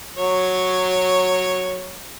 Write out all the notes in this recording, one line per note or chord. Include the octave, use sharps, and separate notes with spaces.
F#3 C#5